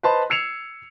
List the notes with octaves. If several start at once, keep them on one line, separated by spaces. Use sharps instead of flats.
B4 C5 D#5 A5 B5 C6
E6 G#6 C7 C#7 E7 F7